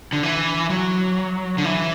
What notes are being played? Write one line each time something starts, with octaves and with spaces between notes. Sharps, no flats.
D3
E3
F#3
D3
E3